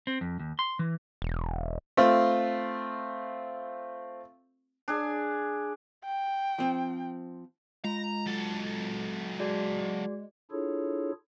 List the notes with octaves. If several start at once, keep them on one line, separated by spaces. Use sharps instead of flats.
C4
F2
D#2
C6
E3
E1
A3 C4 F4
D4 G#4 G#5
G5
F3 C4
G#3 F4 A#5
F#3 A4
F#4 G#4 D5
D4 E4 F4 G#4 A4 C#5